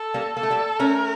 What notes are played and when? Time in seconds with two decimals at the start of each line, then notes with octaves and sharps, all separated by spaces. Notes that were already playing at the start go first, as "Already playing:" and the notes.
Already playing: A4
0.14 G3 A#3
0.36 A#3 A4
0.43 A3
0.50 G3 A#3
0.79 A3 C#4 A#4